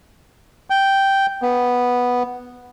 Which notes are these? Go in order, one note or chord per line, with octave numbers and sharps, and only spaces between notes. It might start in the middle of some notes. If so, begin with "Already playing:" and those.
G5
B3